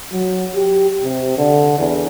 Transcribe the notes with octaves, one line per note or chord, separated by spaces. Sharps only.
F#3
G4
C3
D3
E2